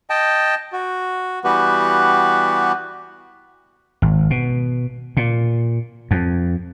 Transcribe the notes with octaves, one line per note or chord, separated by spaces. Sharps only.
D#5 G5 A5
F#4
E3 G3 B3 F#4 G4 B4
G#1
B2
A#2
F2